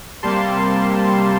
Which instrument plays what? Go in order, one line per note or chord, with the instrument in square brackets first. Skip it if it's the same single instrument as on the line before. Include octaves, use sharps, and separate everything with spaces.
[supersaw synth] C3 G3 A#3 A5 C6